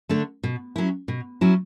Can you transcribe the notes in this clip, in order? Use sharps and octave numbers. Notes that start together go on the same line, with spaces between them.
D3 A3 D4
B2
F#3 C#4 E4
B2
F#3 C#4 E4